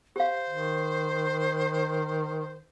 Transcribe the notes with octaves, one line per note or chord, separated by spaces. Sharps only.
G4 C5 F5
D#3